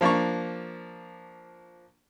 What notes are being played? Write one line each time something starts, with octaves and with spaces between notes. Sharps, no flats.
F3 A#3 D4 A#5 C#6